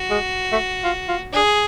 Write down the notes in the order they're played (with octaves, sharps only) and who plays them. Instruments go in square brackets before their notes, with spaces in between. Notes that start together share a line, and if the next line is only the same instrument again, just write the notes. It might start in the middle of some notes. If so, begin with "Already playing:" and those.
Already playing: [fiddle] F#4
[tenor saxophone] G#3
A3
F4
F4
[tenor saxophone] D4 [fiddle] G#4